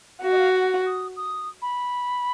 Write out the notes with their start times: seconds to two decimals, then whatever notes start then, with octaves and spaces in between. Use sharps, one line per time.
0.24 F#4 F5
0.32 D#5
0.38 F5
0.55 F#5
0.86 D#6
1.16 D#6
1.62 B5